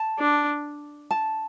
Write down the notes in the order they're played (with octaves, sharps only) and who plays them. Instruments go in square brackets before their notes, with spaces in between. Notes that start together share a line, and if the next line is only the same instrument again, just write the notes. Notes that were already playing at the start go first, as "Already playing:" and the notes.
Already playing: [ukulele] A5
[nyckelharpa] D4
[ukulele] A5